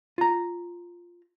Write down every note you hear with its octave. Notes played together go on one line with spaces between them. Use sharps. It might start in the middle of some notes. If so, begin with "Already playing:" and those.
F4 A#5